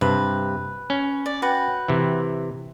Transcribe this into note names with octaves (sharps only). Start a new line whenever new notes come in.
G2 C3 B4
C#4
D5
F#4 B4 G5
C3 E3